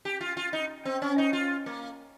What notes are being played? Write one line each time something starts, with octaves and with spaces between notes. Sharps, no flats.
G4
F4
F4
D#4
C4
C#4
D#4
F4
A#3